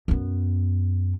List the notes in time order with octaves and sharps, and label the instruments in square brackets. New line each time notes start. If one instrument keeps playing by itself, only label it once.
[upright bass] F#2 B3